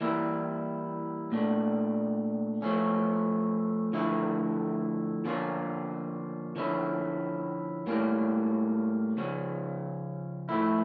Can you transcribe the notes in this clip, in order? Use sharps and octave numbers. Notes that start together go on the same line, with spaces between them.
E3 G3 A#3 E4
A#2 A3 D4
F3 A3 C#4
D3 F3 A3 E4
D3 F3 A#3 C#4 F4
D3 F3 C#4 E4
A2 G3 A#3 C#4
C#3 F3 C#4
A2 F3 A3 E4